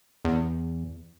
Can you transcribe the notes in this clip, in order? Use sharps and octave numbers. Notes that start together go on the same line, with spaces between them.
E2